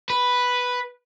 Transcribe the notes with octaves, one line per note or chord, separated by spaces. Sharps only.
B4